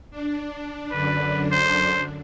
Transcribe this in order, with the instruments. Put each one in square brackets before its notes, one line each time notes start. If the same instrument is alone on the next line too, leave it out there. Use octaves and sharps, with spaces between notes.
[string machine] D4
[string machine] F#2 D3 D4 [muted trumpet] B4
[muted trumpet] C5